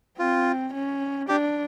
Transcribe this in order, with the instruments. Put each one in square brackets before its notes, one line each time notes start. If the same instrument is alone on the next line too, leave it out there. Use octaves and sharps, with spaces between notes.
[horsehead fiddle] C4 [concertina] F4
[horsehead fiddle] C#4
[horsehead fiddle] D4 [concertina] G4